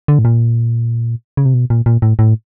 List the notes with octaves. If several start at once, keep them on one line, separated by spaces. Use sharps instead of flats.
D3
A2
A#2
C#3
C3
B2
A#2
A#2
A2
A2